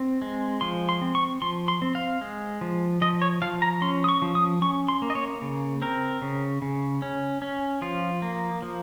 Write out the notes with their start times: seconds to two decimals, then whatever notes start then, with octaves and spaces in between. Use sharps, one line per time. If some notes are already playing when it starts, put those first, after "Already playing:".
Already playing: C4
0.22 G#3
0.61 F3 C6
0.89 C6
1.01 C4
1.15 C#6
1.42 F3 C6
1.68 C6
1.82 C4
1.95 F5
2.21 G#3
2.61 F3
3.01 F3 D#5
3.22 C#5
3.42 F3 F5
3.62 A#5
3.82 C#4 C6
4.04 D#6
4.09 C#6
4.22 F3
4.35 D#6
4.62 C#4 C#6
4.88 C6
5.02 A#3
5.10 D#5
5.15 C#5
5.42 C#3
5.82 C4 A#4
6.22 C#3
6.62 C#3
7.02 C#4
7.42 C#4
7.82 F3 F4
8.22 A#3
8.62 F3